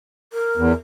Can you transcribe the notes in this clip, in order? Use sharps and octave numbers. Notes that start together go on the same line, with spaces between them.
A#4
E2